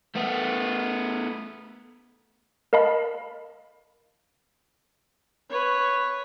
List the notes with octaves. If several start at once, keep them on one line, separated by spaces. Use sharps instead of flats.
A3 B3
A#4 D#5 F5 A5 B5
B4 C#5